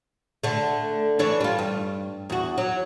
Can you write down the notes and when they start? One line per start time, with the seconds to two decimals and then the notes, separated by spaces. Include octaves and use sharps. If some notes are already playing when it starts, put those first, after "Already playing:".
0.43 D3 A3
1.19 E3 D4 C#5
1.41 G3 F4
1.59 G2
2.30 E2 F#4
2.58 F#3